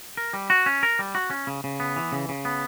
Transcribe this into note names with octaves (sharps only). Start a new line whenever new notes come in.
A#4
G3
F#4
C#4
A#4
G3
F#4
C#4
C#3
C#3
B3
E3
C#3
C#3
B3